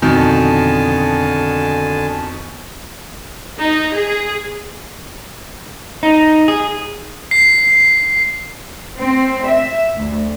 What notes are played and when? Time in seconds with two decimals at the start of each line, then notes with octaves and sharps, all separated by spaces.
0.02 F2 B2 D3 D#3 G#5 A5
3.60 D#4
3.92 G#4
6.03 D#4
6.48 G#4
7.31 C7
8.98 C4
9.45 E5
9.97 D2